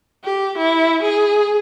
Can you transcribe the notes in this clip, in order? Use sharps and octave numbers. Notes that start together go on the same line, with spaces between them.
G4
E4
G#4